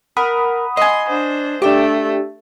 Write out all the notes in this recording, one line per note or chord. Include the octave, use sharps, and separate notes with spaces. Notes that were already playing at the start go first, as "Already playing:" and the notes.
A#4 F#5 B5 D#6
D#5 G#5 C6
D4 C5
A3 D4 G4 G5 D6